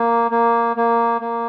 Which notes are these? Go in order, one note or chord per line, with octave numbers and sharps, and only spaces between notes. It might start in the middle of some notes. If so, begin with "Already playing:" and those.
Already playing: A#3
A#3
A#3
A#3